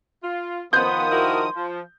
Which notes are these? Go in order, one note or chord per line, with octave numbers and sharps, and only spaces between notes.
F4
D#3 F3 B3 C6 D#6 G6
E4 F#4 A#4
F3